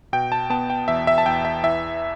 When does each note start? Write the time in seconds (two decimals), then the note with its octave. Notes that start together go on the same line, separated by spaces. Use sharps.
0.13 B2 G5
0.32 A5
0.50 B3 A5
0.70 G5
0.88 E2 E5
1.07 E5
1.18 A5
1.26 E2 G5
1.45 E5
1.63 E3 E5